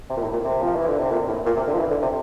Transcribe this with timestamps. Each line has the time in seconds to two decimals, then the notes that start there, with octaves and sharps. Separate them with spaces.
0.10 C3
0.17 A#2
0.21 A2
0.33 A#2
0.44 C3
0.62 F3
0.76 E3
0.88 D3
1.00 C3
1.11 A#2
1.28 A2
1.46 A#2
1.56 C3
1.67 D3
1.74 F3
1.79 E3
1.91 D3
2.02 C3